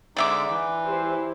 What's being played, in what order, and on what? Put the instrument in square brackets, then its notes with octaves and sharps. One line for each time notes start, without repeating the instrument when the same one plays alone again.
[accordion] D3 G#3 D#4 [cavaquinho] D5 E5 D6
[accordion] E3
[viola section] E4 G4 C5